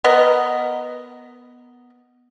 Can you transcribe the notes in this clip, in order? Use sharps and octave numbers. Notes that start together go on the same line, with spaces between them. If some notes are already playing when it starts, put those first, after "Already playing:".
B3 A#4 D#5